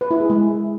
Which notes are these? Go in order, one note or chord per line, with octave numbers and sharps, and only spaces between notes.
B4
E4
G#4
G#3